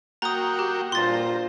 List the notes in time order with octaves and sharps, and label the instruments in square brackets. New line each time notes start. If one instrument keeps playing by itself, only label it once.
[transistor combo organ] A#3 F#4 G5 [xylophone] A#5 D#6
[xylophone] G4
[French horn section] G2 A#2 [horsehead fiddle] F4 C5 [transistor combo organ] A#5 [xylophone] C6 A6